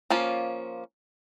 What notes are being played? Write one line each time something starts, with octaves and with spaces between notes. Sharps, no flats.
F3 A#3 C#4 F4